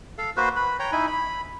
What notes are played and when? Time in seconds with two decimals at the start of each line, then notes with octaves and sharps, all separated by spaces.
0.18 A4 F5
0.37 A#3 F#4 B4 C5
0.56 B4 B5
0.79 C#5 G5 A#5
0.92 D#4 E4 G#5 B5
1.07 B5